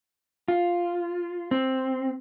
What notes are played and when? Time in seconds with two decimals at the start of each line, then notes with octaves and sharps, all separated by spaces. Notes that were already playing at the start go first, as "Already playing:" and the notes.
0.48 F4
1.51 C4